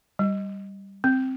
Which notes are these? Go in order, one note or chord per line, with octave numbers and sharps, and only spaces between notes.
G3
C4